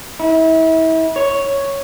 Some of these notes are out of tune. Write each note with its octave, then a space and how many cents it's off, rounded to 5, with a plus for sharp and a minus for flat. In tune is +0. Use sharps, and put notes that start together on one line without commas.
E4 -35
C#5 +0